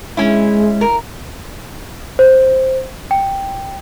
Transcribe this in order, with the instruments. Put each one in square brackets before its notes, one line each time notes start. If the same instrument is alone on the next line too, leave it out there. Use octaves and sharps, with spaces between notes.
[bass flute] G#3 [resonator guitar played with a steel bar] C#4 E4
[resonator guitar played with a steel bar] A#4
[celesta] C5
G5